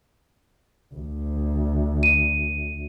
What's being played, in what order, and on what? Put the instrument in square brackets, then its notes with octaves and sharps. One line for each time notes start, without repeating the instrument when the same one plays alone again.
[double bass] D2
[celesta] D#7